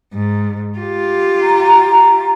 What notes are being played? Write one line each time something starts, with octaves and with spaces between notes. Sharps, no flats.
G#2
F4 G4
A#5